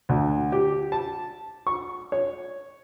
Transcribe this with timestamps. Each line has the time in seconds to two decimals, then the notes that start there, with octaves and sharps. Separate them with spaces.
0.09 D2
0.52 G4
0.92 A5
1.67 C#6
2.12 C#5